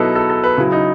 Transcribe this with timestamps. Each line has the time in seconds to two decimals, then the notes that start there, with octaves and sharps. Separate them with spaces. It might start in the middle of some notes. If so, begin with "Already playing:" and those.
Already playing: B2 F#3 D#4 E4 A4 B4
0.15 A4
0.30 A4
0.44 B4
0.58 C#3 F#3 E4
0.72 D#4